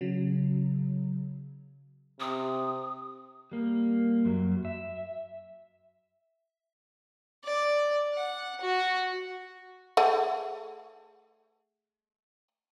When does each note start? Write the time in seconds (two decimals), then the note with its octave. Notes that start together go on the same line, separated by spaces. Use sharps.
0.01 C#3 F#3
2.20 C3 D#6
3.52 G3 A#3
4.25 F#2 F#3
4.65 E5
7.44 D5
8.14 F#5
8.61 F#4
9.97 A3 G#4 F#5